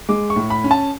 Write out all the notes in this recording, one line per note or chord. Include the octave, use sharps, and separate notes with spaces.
G#3 D6
C#6
A2
B5
C#4
A5